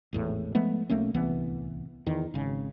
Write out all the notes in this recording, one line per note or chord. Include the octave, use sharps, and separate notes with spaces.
G#1 E2 A2
F3 G#3 A3 B3
B1 A3 A#3 C#4
D1 C2 E3 B3
E2 D#3
G#1 C#3